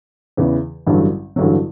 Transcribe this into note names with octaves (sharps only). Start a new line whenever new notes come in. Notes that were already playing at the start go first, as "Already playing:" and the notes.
E2 C#3 E3
A1 G2 D3 F#3
A1 G2 D3 F#3